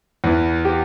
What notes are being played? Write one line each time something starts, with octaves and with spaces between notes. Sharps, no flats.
E2 E3
G4